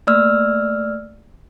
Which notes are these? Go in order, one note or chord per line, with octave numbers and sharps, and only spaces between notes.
A3 A#3 D5 E6 F6